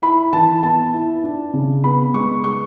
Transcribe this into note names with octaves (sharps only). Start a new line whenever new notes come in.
E4 B5
E3 A5
B3 A5
E4
D4
C#3
B3 B5
G#3 C#6
C#6